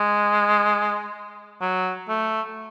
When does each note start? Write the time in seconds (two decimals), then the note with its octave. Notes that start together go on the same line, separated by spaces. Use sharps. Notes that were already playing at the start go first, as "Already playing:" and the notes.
Already playing: G#3
1.61 F#3
2.09 A3